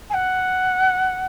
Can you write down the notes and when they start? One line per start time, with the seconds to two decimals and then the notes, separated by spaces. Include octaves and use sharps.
0.10 G#5
0.14 F#5